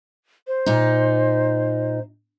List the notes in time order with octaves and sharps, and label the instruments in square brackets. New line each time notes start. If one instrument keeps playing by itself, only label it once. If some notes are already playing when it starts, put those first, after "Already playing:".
[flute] C5
[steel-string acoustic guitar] A#2 D#4